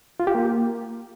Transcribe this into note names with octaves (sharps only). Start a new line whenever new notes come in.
F4
G4
A#3